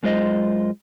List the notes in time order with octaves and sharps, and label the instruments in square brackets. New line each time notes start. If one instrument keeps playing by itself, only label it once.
[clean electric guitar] F#2 G#3 F4 C5 D#5